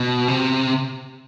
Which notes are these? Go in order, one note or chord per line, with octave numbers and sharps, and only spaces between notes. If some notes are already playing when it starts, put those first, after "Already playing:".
Already playing: B2
C3